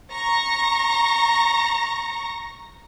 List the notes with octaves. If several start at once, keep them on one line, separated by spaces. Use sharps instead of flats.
A#5 C#6 A#6